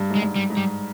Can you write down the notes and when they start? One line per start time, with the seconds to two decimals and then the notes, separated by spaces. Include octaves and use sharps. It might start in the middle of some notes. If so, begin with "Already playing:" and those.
Already playing: G2
0.10 G#2
0.15 G#3
0.22 G2
0.36 G3
0.50 G#2
0.57 G3